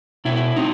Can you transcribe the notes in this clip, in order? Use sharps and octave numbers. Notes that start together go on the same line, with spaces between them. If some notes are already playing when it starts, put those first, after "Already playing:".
B2 E4
C4 D#4